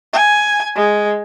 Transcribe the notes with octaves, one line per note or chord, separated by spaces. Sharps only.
G#5
G#3